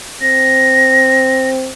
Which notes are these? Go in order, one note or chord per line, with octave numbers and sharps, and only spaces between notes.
C4 A#6